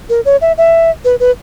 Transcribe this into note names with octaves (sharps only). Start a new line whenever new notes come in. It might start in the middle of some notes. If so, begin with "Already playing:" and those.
A#4
C#5
E5
E5
B4
B4